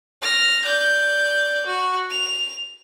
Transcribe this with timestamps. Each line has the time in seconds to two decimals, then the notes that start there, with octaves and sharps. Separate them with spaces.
0.22 F6 A#6
0.65 D5 G6
1.66 F#4
2.10 F7